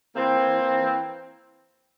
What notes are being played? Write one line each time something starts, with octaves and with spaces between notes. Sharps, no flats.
E3 A#3 C4
E3
E3
E3